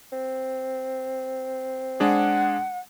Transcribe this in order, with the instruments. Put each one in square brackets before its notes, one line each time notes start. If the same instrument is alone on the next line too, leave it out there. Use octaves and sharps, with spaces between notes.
[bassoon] C4
[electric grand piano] G#3 D4 G#4 [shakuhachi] F#5